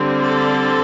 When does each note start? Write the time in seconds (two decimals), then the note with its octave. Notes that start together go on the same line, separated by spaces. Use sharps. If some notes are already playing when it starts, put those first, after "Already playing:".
Already playing: D3 G3 C4
0.21 A4